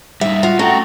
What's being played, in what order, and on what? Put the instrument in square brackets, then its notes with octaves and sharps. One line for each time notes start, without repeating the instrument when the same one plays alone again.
[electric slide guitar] G3 D#4 [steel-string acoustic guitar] E5
[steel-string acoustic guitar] F4 F#4
[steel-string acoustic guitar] A3 [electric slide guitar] C#4 G5 [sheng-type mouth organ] F#4 A#5